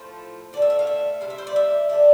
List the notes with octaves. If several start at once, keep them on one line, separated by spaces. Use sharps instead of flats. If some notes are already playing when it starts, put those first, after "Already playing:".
Already playing: A2 F3 A3 C5
D3 A3 D5 E5
E5
F5
E5
C3 G3 F5
E5
C5
D5
E5
D3 A3 D5